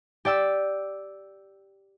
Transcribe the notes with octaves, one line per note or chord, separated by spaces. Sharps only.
G4 D5 G5 E6